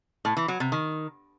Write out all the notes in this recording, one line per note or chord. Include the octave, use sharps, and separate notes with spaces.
A2
E3
F#3
C3
D#3